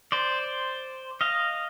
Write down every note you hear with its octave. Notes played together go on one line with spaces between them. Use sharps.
C5 D5
D#5 F5